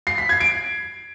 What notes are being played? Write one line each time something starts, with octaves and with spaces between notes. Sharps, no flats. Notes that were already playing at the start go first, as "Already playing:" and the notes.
C7
B6
G#6
D7